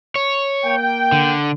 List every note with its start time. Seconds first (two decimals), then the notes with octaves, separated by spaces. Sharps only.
0.15 C#5
0.65 A#3 G5
1.12 D3